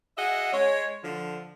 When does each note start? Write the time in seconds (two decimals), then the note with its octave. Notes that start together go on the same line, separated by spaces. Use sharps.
0.17 F#4 G#4 D#5 E5 F#5
0.53 G#3 C#5
1.04 D3 F3